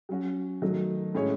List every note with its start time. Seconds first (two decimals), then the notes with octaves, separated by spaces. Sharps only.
0.09 F#3 C#4 F#4
0.62 D#3 F#3 A3
1.15 A2 G#3 C#4 G#4 C#5